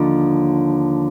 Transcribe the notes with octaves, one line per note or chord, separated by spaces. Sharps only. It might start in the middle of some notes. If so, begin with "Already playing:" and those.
Already playing: D#2 D3 F3